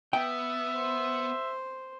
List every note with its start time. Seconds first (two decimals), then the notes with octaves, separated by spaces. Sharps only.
0.13 B3 E5 G5
0.76 C5